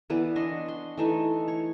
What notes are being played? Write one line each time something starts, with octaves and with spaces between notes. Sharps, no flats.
E3 B3 B4 D5
D4 C#5 D#5 C6
C6
E3 A3 D#4
C#5